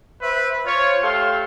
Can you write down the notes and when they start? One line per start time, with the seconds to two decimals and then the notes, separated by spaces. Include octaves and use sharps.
0.21 B4 C5 E5
0.66 F4 C5 C#5
1.02 A3 G4 A4 F5 C6